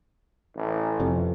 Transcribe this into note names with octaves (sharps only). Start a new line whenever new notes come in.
A1
F2 C3